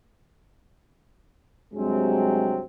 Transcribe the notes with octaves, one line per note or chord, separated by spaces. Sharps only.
G2 C3 F#3 G#3 C4